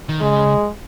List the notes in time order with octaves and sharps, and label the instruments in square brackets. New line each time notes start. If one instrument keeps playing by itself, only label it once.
[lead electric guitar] D#3
[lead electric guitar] C#3 [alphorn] G#3